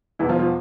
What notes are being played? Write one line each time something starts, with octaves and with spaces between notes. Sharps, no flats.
E2 B2 E3 E4
F3 F4
F3 F4